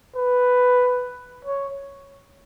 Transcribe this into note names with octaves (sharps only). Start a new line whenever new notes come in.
B4
C#5